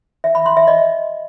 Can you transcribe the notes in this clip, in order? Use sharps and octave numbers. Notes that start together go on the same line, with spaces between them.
E5
B5
C6
E5
D#5